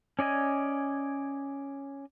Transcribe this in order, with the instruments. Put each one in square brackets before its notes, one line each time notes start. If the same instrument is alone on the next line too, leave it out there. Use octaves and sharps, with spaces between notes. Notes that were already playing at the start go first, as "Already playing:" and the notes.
[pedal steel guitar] C#4 D5 D#5 G#5